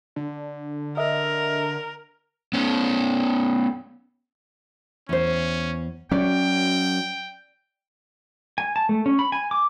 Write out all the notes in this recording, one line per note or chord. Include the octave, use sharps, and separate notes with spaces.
D3
A#4 D#5 E5
B3 C#4
E2 C#4 C5
F#3 C#4 D5 G5
G#5
A5
A3
C#4
B5
G#5
D6